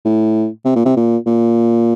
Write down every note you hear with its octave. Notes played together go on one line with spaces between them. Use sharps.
A2
C3
A#2
C3
A#2
A#2